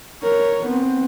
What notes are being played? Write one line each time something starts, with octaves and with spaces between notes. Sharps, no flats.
A#4 C#5
B3 C4